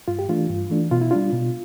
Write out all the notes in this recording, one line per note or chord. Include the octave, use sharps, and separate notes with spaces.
G2 F4
G4
E3 A3 D4 F4
G2
E3 A3 D4
B2 F4
E4
G3 D4 F4
B2